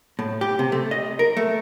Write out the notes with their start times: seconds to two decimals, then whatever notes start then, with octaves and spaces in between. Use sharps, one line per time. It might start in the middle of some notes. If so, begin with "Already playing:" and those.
0.19 A2
0.41 G4
0.59 C3
0.72 A3
0.91 D#5
1.19 A#4
1.37 A3